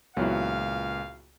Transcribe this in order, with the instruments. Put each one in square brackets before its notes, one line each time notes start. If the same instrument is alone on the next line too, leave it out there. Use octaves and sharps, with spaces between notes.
[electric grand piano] C#2 A#2 [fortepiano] F#3 B3 E4 [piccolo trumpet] F5